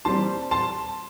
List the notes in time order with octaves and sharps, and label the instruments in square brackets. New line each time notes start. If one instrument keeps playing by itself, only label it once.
[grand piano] E3 G3 C4 A5 C6
A5 C6